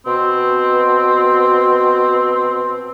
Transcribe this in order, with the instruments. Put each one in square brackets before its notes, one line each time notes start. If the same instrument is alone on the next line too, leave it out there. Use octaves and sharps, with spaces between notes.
[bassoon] B2 [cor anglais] C4